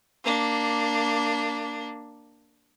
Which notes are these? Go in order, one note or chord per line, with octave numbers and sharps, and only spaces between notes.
A#3 D4